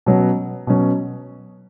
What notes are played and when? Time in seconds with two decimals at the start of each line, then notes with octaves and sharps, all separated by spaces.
0.06 B2 F#3 C#4
0.67 B2 F#3 C#4